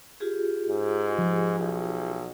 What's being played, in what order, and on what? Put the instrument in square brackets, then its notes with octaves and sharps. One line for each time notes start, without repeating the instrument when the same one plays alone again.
[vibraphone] F4 G4 G#4
[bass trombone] G#2
[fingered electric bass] F3
[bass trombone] B1